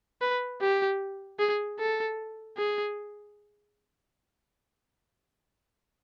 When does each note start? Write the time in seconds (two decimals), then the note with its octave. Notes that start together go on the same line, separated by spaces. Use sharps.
0.21 B4
0.61 G4
1.39 G#4
1.79 A4
2.57 G#4